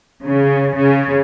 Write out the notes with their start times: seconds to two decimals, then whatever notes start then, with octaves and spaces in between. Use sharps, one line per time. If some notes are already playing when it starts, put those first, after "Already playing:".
0.23 C#3
0.75 C#3